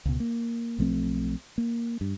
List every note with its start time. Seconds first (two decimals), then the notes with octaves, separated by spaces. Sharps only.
0.06 C#2 B2
0.20 A#3
0.79 B1 F3 A3 C4
1.58 A#3
2.01 G2